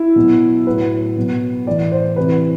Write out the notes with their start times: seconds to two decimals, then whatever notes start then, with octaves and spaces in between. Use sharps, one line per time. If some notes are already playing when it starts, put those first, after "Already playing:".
Already playing: E4
0.16 B2 F#3
0.67 A2 F#3 B4
1.17 B2 F#3
1.66 A2 E3 D5
1.92 C5
2.16 C3 E3 B4